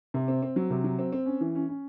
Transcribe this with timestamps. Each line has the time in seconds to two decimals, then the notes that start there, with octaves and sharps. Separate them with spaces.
0.14 C3
0.28 C4
0.42 C4
0.56 F#3
0.70 C3
0.84 F#3
0.99 C4
1.13 C4
1.26 C#4
1.41 E3
1.55 C#4
1.69 C#4